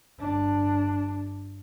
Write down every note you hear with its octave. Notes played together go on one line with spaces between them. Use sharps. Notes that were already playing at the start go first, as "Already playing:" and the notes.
G1 D4